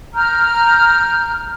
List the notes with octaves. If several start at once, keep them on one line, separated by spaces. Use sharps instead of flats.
A#5 F6 G6